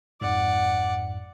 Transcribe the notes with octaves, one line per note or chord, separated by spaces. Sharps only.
G1 F2 G#2 D5 F#5